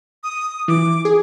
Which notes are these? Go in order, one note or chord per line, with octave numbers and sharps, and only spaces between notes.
D#6
E3 D6
G#4